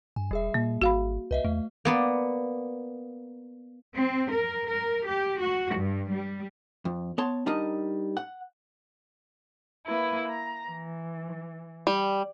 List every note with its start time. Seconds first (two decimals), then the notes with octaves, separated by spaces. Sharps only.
0.16 G2 G#5
0.31 E1 G3 G#4 E5
0.54 A#2 A#3
0.82 G#1 F#4 F5 B5
1.31 C2 B4 D#5 E5
1.45 E2 A3
1.85 A#3 B3 D5
3.95 C4
4.33 A#4
4.69 A#4
5.07 G4
5.40 F#4
5.76 G2
6.11 G3
6.85 F2
7.18 B3 C#5 A5 C6
7.46 G3 D4 D#4 A#4 D#5
8.17 F#5
9.87 A#3 E4 B4
10.28 A#5
10.65 E3
11.87 G3